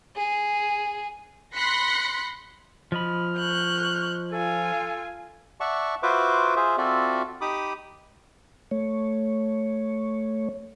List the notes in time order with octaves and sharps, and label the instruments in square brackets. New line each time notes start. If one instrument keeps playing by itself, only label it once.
[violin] G#4
[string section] B5 C6 F#6 A#6 B6 C#7
[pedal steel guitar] F3 D#5 B5 [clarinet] F6
[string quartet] C#6 F#6 G6
[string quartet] F4 G#5 [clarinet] A4
[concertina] D5 E5 F#5 A5 C#6
F4 F#4 B4 C5 E5 D6
F4 G#4 C5 E5
C4 F4 F#4 A4 D5 E5
D#4 G4 B5 D6 D#6
[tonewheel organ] A3 C#5